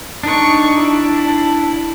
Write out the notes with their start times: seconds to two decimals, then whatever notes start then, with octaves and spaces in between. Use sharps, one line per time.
0.23 D4 D#4 C#6
0.76 E4